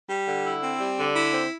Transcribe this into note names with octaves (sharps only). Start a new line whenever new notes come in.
G3
D3
E4
C4
G3
D3
E4
C4